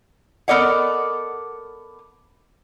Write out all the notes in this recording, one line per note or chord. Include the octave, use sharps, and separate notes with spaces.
B3 A4 A#4 D5 D#5 F#5